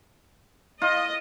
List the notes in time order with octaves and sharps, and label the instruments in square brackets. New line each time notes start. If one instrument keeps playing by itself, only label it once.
[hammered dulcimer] F4 [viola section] D#5